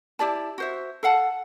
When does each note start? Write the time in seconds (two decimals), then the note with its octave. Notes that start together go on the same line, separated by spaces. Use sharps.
0.19 E4 G4 D5 A5
0.58 F#4 C5 E5
1.03 A4 F5 F#5 A5